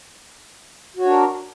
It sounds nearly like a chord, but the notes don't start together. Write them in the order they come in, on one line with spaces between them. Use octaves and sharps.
F#4 C#5 D4 A#4